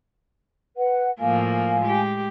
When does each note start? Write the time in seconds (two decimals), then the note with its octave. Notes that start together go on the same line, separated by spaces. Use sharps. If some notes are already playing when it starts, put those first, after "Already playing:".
0.77 B4 F#5
1.20 A2 F3 A#3 F5 G#5
1.81 G#3 G4